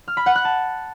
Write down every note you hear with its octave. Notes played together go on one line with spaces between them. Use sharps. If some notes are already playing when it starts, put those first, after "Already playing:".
F6
B5
F#5
F#6
A5